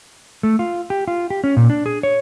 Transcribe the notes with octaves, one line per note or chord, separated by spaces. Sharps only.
A3
F4
G4
F4
G4
C#4
A#2
D4
G#4
C#5